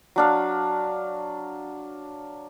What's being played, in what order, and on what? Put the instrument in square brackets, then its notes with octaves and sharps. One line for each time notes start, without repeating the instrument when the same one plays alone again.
[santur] F#3 D4 F5